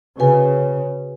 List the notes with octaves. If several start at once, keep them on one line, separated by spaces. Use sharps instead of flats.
C#3 F#4 B4 G#5